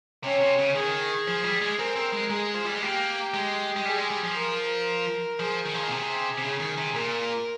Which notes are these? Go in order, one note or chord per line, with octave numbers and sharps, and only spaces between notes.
C3 C#4
C3
C#3
D#3 G#4
F3
G3
G#3
C4 A#4
C4
G#3
G#3 G#4
F3
G3
G#3
A#3 G4
G#3
G#3
G3 G#4
G#3
G3
F3
A#4
F3 G#4
D#3
F3
D#3
A#2
C3
C3
C#3 G#4
D#3
C3
A#2 A#4